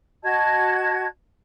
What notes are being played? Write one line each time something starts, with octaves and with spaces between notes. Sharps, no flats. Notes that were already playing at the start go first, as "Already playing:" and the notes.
F#4 D#5 A5 G#6